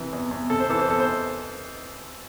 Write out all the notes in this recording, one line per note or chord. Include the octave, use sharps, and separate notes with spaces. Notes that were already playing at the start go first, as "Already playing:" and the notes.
Already playing: C3 E3
E2
E2
C3 A4
C5
E3 A4
C5
E2 A4
C5